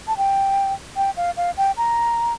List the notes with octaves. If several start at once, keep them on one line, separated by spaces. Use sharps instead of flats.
A5
G5
G5
F5
F5
G5
A#5